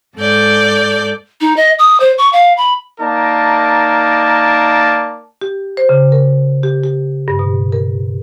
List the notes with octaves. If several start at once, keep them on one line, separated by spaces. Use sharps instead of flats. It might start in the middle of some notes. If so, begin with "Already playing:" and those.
G#2 A4 D5 G6
D#4
D#5
D#6
C5
C#6
F5
B5
A#3 D#4 A#4 D5 A5
G4
C5
C#3
A#4
G4
G4
G2
B2
A#4